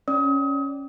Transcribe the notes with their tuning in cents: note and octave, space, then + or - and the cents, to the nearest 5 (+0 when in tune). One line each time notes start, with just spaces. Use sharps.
C#4 +0 D5 +0 D#6 +35